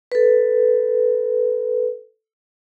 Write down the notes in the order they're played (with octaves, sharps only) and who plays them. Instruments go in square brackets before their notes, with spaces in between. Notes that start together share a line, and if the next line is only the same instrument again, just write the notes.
[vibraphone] A4 B4